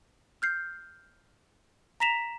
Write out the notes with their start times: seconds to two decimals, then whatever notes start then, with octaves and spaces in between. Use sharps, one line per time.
0.42 F6 G6 C7
2.00 A#5 A#6 B6 E7 F7